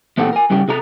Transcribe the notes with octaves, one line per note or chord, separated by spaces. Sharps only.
E2 A#2 C4 G4 A4 F#5
A#4 G#5
G2 C#3 G3 G4
C3 G#4 A4 A#5